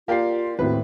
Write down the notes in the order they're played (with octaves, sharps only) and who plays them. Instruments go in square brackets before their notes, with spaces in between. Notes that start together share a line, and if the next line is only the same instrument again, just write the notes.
[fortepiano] A#3 G4 D5 [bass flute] F4 [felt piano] F5 C7
[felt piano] D#2 A2 F#4 [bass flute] C4 [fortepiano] B4